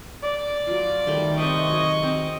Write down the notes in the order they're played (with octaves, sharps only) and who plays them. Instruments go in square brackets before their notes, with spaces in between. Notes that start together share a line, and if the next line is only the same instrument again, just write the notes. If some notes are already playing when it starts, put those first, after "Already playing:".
[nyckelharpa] D5
[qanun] F#3 F4
D#3 G3 A3
[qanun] C3 B4 C5 [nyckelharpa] D#5 C#6
[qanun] F#3 G#4
C4 D6